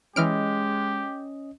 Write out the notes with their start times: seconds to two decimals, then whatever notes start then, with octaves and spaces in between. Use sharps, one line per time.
0.16 E3 G#3 C#4 G4 D#5 F6 D7